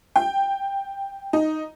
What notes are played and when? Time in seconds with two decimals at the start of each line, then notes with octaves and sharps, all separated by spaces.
0.16 G5
1.33 D#4